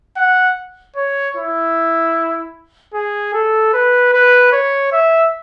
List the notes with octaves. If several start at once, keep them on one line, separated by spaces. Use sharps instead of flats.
F#5
C#5
E4
G#4
A4
B4
B4
C#5
E5